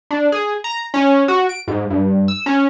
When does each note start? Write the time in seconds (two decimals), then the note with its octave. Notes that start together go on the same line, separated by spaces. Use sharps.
0.11 D4
0.32 G#4
0.64 A#5
0.94 C#4
1.28 F#4
1.49 D7
1.68 G#2
1.90 G2
2.28 E6
2.46 C#4